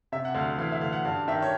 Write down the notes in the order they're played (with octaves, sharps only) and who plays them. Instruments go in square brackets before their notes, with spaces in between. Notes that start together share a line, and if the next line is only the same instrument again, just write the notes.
[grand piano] C3 E5
F#5
D2 F5
E3 F5
E5
D2 F5
F#5
G2 F5
D#3 E5
C#5